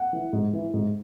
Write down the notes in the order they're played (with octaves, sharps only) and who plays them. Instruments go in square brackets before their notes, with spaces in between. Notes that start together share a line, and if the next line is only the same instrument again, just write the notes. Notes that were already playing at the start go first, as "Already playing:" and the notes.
Already playing: [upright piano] F#5
E3
G#2
E3
G#2